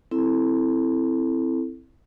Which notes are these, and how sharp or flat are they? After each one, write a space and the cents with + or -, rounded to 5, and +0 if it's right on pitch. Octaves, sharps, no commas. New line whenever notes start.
C4 +0 E4 +0 A4 +0